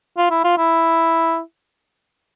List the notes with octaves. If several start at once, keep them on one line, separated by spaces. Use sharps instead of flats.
F4
E4
F4
E4